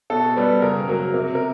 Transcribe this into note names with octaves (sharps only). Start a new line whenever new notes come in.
B2 A4
G3 B3
C#3 A#4
F#3 A#3
C3 A#4
A#4